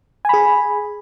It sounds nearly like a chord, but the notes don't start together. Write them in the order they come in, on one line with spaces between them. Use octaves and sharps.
G#5 B5 G#4